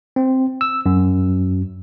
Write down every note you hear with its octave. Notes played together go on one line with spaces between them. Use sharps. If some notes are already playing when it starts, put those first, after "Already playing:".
C4
E6
F#2